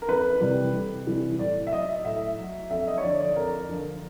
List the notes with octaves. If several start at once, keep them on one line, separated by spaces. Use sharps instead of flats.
A#4
F2 B4
C3 E3 G3
F2
C3 E3 G3
A2 D5
E5
F#3 D#5
A2 E5
F#3
F2 E5
D#5
C#5
D3 F3 D5
D5
F2 A#4
D3 F3